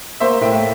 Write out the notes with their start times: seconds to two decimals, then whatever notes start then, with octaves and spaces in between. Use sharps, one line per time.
0.20 A#3 C5 E5
0.41 A2 E5 G5